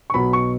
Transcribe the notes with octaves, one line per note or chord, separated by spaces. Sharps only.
C#6
B1 B2 F#3 B3 B5
C#6